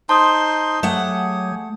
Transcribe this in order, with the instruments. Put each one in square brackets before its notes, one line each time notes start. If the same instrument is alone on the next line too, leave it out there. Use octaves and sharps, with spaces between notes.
[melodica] D#4 C5 C6 [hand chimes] A5 D#6
[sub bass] F#3 [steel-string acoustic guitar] A3 F#5 [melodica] G4 G#4 G#5